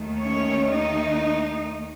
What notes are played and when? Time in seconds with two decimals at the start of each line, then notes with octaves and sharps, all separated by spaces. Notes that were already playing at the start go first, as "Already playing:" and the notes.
Already playing: D#2 D#3 A3
0.22 C#4 C#5
0.72 D#4 D#5